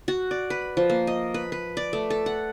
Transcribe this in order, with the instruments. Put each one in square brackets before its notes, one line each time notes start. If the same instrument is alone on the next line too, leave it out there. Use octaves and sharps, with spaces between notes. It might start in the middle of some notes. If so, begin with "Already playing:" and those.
[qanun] F#4
D5
B4
F3
A#3
D#5
B4
B4
D5
A3
A4
F#5